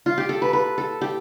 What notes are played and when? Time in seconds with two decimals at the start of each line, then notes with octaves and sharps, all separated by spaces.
0.06 F4
0.18 G4
0.29 A4
0.42 B4
0.53 B4
0.78 A4
1.01 G4